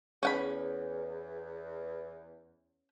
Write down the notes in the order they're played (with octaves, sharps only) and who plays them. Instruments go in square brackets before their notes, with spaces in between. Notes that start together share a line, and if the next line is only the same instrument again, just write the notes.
[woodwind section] E2 [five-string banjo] C#4 F#5 B5 [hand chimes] G#4 B4